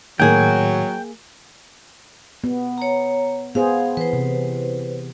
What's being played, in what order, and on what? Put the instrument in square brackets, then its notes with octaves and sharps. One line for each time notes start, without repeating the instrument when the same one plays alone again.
[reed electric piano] A2 D#3 [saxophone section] F#3 [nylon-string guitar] A#3 G#4 [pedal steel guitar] G5
[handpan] B3
[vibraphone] C#5 A#5
[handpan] B3 G#4 C5 [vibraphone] F5
[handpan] E3 [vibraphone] B4 C5
[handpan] C3